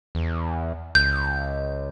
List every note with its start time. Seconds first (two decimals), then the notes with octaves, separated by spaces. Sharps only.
0.15 E2
0.95 C#2 G6